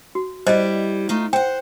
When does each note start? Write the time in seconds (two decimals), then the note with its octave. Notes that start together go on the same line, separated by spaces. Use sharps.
0.15 F#4
0.47 G3 E4 C5 D5 D#5
1.09 A3 D#4 F4
1.33 C5 F#5 G5